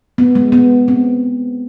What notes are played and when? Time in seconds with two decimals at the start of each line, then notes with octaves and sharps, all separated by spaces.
0.18 B3
0.35 G#3
0.52 B3
0.88 C4